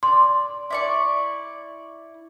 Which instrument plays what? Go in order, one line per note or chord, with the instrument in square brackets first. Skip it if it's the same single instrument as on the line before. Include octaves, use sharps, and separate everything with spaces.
[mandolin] D5 [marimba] C6
[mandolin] E4 D5 C#6